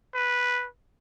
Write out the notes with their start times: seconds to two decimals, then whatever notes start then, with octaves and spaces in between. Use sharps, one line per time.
0.14 B4